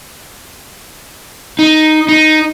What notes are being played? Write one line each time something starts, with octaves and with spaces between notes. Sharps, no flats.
D#4
D#4